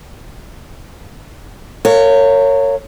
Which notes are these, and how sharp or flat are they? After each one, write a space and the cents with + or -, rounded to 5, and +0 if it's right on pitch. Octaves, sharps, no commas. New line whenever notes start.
A#4 -35 C#5 +0 F5 +0